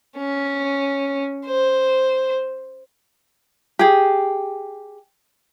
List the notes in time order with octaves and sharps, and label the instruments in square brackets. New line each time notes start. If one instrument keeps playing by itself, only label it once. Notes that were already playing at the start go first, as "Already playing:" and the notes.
[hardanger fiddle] C#4
C5
[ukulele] G4 G#4